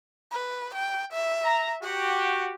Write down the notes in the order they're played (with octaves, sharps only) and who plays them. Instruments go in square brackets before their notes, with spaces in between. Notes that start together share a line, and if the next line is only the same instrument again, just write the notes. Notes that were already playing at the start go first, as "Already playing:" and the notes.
[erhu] B4
G5
E5
[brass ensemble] A#5
[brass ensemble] F#4 G4 [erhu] F#5